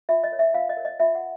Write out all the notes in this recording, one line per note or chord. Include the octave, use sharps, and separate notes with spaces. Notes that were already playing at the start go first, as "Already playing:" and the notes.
F4 E5
D#5
A#4 C#5
E5
F4 F5
D#5
A#4 C#5
D#5
F4 E5
F#5